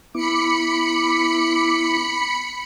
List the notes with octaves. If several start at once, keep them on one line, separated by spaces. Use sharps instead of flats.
B3 E4 B5 D6 C#7